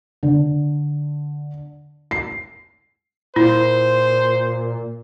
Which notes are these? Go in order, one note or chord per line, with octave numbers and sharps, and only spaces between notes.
D3
C7
A#2 E4 C5